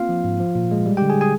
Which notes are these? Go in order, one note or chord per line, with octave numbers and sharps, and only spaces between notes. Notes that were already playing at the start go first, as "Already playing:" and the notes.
Already playing: A#3 C4 F4 F5
F3
G#2
F3
A#2
G#3
G3
D3 G4 G5
G#4 G#5
G#4 G#5